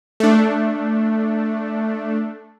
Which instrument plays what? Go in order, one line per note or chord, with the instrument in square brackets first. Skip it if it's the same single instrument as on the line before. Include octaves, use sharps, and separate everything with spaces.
[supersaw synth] A3 D4